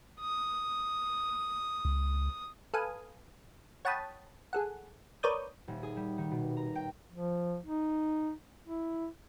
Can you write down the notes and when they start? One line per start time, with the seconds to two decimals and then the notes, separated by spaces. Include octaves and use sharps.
0.20 D#6
1.85 C#2
2.74 A4 B4 F5 G#5 D#6
3.85 C#5 F#5 G5 A5 B5 D#6
4.53 G#4 A4 F#5
5.23 A#4 B4 C#5 D5 D#6 G6
5.68 D#1
5.83 G#4
5.97 G3
6.18 D#3
6.31 B2
6.57 A#5
6.75 G5
7.12 F3
7.66 D#4
8.67 E4